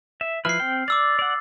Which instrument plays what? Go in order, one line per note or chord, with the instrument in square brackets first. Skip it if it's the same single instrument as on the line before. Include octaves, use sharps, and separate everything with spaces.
[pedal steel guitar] E5
[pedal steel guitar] F3 E4 B4 [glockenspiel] F6 C7
[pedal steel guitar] C4 G5
[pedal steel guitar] D5 [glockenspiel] D6 E6 A6
[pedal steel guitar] D5 F#5